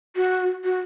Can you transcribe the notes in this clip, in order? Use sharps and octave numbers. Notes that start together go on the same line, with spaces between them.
F#4
F#4